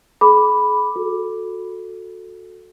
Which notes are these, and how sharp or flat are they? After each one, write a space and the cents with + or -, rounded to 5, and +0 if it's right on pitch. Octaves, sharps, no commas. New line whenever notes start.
G#4 +40 B5 +0 D6 +0
F#4 -20 A4 +0